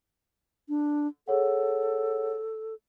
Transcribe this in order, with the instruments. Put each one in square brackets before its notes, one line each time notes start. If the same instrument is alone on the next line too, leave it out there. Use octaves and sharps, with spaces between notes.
[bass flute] D4
[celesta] G#4 C#5 F#5 [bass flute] A4